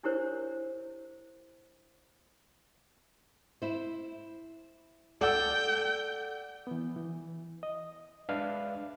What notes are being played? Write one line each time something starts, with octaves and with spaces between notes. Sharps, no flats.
D4 E4 G4 A#4 C5 C#5
E4 C5
A4 D5 F#5 G5 E6
E3 B3
E3
D#5
G#3 D4 B4 D5 E5 F5